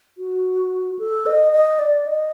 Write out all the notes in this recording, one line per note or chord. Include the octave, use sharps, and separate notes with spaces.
F#4
A4
D#5
D#5
D5
D#5